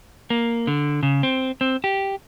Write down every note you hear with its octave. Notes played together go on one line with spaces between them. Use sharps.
A#3
D3
C#3
C4
C4
G4